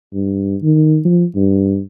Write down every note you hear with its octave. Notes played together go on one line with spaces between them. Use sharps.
G2
D#3
F3
G2